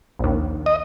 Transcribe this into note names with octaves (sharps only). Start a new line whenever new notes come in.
A#1 D#2
D#5